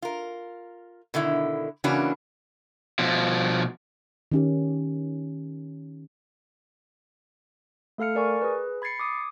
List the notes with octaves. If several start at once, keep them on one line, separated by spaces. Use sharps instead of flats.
F4 A#4
B2 D3 D#3 E4
C#3 E3 A#3 C#4 D4 F#4
B2 F3
D#3 C#4 G4
A3 A4 F5 F6 C#7
A#4 D5 G#5 C#6
G#4 B4
B5 G#6 A6 C7 C#7
D6 D#6